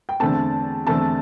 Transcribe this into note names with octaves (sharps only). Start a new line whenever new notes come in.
G5
E2 D3 A3 C4 A5
E2 D3 A3 C4 A5